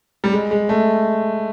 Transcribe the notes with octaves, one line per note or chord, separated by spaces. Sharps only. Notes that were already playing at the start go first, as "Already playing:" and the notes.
G3
G#3
G#3
A3